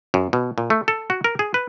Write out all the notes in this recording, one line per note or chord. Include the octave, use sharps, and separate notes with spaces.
F#2
B2
A#2
A3
A4
F#4
A#4
G#4
B4